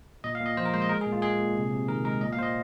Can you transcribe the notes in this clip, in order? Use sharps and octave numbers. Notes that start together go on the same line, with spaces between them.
A#2 D#5
F5
A#2 D#5
F3 C5
A#4
G#3 C5
D#5
G#3 A#4
G#4
A#2
F4
G#3 G#4
A#2
C3
C3
D#3 A#4
G#3 A#4
A#2 D#5
F5
A#2 C5
D#5